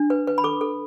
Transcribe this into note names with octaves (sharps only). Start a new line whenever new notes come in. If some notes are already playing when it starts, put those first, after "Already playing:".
Already playing: D4
B4
B4
B5
A4 D6
A4